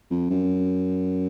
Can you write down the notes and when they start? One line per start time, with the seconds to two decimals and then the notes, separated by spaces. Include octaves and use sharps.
0.10 F2
0.30 F#2